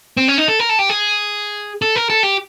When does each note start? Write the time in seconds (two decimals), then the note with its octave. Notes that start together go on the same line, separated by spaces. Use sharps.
0.17 C4
0.28 C#4
0.38 D#4
0.48 A4
0.59 A#4
0.69 A4
0.79 G4
0.89 G#4
1.82 A4
1.96 A#4
2.10 A4
2.23 G4